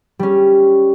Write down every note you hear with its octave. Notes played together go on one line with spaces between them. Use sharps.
G3 C#4